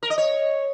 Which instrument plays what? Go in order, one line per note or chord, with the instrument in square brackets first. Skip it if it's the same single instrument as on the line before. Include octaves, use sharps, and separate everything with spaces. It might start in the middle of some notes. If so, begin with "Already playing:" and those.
[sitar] A#4
D#5
C#5